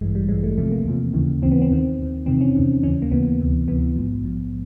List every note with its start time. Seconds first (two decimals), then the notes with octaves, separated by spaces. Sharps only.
0.01 A1 G2 E3 G#3
0.15 G3
0.29 A1 G2 E3 G#3
0.43 A3
0.57 E2 C3 F3 A3
0.72 A#3
0.86 E2 C3 F3
1.13 D#2 C#3 E3
1.42 D#2 C#3 E3 C4
1.52 B3
1.62 C4
1.70 D#2 D#3
1.99 D#2 D#3
2.26 E2 C3 D#3 C4
2.41 C#4
2.56 E2 C3 D#3
2.83 D#2 C#3 E3 C#4
3.02 A#3
3.12 D#2 C#3 E3 B3
3.40 D2 C3 E3
3.68 D2 C3 E3 B3
3.96 A#1 G#2 F3
4.24 A#1 G#2 F3